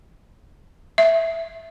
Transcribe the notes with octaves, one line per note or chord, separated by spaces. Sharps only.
E5